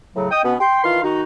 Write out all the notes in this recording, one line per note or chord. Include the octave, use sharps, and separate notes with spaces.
A2 C#3 F#3
D#5 G5 D#6
B2 B3 C#4
G5 C6
D#3 E3 F4 F5 C6
D#3 D#4 F#4